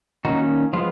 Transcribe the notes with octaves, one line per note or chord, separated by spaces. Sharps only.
D#3 A#3 C#4 D#4 F#4
F3 G#3 B3 F4